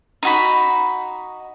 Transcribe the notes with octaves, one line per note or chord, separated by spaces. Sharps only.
D#4 F#4 B5